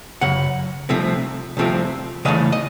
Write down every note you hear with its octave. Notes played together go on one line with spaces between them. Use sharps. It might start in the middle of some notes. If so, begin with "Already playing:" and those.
F#2 C#3 F#5
C2 C3 F3 A3 C4
C2 C3 F3 A3 C4
C#3 E3 A3 D#5 F5
D#5